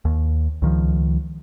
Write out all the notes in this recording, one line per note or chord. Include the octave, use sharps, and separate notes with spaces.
D#2
C#2 D#3 F3